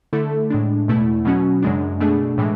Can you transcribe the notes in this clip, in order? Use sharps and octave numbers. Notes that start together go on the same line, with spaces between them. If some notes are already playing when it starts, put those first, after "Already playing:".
D3 A3 E4 A4
A2 G#3 D4
E2 B2 A3 E4
B2 F#3 C#4 F#4
F#2 C#3 G#3 D4
B2 A3 D4 G#4
A2 E3 G#3